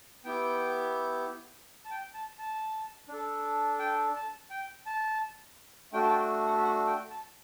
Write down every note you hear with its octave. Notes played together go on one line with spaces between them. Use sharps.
B3 E4 G4 G5
A5
G5
A5
A5
D4 A4
G5
A5
G5
A5
A3 D4 F#4 A4 G5
A5
G5
F#5
E5
F#5
G5
A5